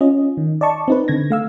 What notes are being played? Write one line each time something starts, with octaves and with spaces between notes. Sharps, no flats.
C#4 F4 D#5
D#3
D5 D#5 A5 C#6
C4 D#4 B4
D3 G#6 A#6
A3 F5 E6